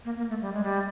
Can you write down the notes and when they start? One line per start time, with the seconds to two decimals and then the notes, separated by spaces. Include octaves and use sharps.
0.05 A#3
0.17 A#3
0.29 A3
0.41 G3
0.53 G#3
0.64 G3